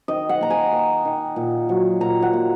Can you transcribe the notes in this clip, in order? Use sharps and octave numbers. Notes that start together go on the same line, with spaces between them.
D#3 D#5
F#5
A#3 A#5
G#5
A#3
D#3
A#2
F#3
A#2 A#5
F#5
A#3